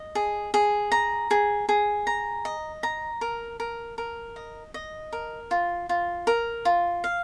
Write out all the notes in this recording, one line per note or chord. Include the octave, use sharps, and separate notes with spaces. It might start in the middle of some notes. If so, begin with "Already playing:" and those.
Already playing: D#5
G#4
G#4
A#5
G#4
G#4
A#5
D#5
A#5
A#4
A#4
A#4
D#5
D#5
A#4
F4
F4
A#4
F4
F5